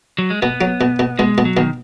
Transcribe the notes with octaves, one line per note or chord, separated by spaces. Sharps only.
F#3
G#3
B2 B3
F#3
B2
B2
B2 G#3
B2
F#3
B2 D#3